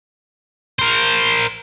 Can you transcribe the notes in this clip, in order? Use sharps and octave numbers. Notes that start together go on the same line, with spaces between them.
A#4 C5